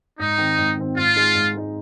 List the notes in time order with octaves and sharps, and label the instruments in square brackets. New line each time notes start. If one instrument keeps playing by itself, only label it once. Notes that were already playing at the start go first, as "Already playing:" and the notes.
[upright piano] G#2 [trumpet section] D#4
[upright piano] D#3 C4
G#2
D#3 C4
[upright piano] G#2 [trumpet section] F4
[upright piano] G#3 D#4
G#2
G#3 D#4